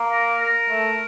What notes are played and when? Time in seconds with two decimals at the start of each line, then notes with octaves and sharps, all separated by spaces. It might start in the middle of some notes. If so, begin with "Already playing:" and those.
Already playing: A#3
0.12 A#4
0.41 A#4
0.70 A3